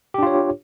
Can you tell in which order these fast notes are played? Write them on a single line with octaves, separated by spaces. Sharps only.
G4 D4 F4 C#5